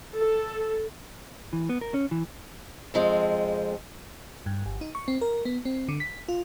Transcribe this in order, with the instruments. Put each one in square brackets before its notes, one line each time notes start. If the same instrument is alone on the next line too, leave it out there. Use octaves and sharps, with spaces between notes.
[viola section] A4
[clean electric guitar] E3
B3
A#4
C#4
E3
[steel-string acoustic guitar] F2 F3 G#3 C4
[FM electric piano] G2
G1
D#4
C#6
C4
A#4
B3
C4
D3
B6
F4